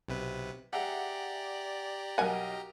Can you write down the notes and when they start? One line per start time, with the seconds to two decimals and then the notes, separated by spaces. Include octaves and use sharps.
0.08 B1 C3 B4
0.73 G4 G#4 D5 E5 F#5 G5 A#5
2.18 B1 A#4 D#5 F#5 G#5 D#7